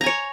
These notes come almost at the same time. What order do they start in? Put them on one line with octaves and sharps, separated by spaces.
A#5 G#5 C#5